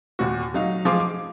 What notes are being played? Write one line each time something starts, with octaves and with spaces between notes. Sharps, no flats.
D#2 A#2 F#4
F#3 D#4 F5
F3 G#4 F5 C6 D6
D6